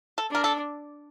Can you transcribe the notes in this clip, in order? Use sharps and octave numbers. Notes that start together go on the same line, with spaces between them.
A4
D4 A#4
A4